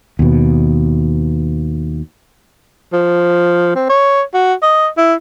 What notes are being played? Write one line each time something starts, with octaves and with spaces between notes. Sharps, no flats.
D#2 B2
F3
C4
C#5
F#4
D#5
E4